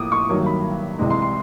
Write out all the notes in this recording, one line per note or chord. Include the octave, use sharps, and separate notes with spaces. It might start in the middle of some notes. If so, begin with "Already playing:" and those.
Already playing: A2 F3 A#3 D6 D#6
C#6
G2 D#3 F#3 A#3
B5
C2 C3 E3 G#3
C6
C6